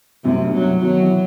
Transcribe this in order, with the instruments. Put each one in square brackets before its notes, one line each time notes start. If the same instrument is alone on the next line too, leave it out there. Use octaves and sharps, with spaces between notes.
[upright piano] F#2 A2 [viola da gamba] C3
[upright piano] G2 B2
[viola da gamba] F#3
[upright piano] A2 C3
[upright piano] B2 D#3 [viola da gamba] F#3
[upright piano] C3 E3